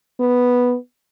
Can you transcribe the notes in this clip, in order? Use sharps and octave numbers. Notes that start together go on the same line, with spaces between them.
B3